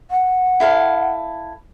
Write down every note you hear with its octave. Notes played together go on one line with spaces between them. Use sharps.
F#5
E4 A4 F5